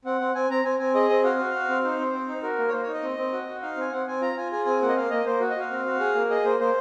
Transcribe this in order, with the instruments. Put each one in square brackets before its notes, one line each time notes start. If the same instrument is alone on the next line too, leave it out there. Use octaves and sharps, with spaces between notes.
[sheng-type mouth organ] C4 F#5
C4
C4 G#5
C4 A#5
C4 G#5
C4 G#5
G#4 D#5
C4
F#4 F5
F#4
F#4
C4
D#4 C5
C4
C4
D#4
F#4 A#4
A#3
C#5
A#3 C5
C#5
D#4
D#5
C4
C4
F#4
F#4
D#4 F5
C4 G#5
C4 F#5
C4 G#5
F4 A#5
F4 G#5
G#4 G#5
C4 G#5
A#3 F#5
D#5
A#3 F5
A#3 D#5
A#3 C5
F#4
D#5
F#4 F5
C4
F#4
G#4
A#3
G#4 D#5
A#3 C5
A#3 C5